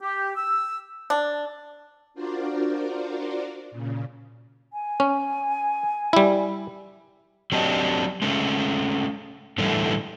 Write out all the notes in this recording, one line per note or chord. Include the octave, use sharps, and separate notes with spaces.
G4
E6
D4
D4 F4 F#4 A#4 C5 D5
A#2 C#3
G#5
C#4
G3 E4
F#3 C4 D4 G4 D#5
G#3 A3 C#4
A2 D3 E3 G3 A3